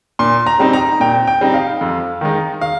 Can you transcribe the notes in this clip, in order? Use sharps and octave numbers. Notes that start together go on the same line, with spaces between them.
A#2 C6
A#5
G3 C4 D#4
A#5
A#2 G5
G5
G3 C4 D#4
F5
F2
D#3 G#3 D#4
F5